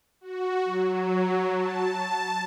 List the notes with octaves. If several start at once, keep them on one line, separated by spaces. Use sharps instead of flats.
F#4
F#3
A5